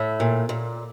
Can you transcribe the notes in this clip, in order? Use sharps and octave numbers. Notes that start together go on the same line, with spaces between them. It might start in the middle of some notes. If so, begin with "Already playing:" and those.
Already playing: A2 E5
A#2
A#2